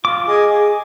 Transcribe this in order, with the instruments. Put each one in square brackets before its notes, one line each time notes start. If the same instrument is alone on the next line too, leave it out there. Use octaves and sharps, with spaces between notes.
[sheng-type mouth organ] F4 [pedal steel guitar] D6
[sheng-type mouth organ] G#4 D#5 G#5
G#4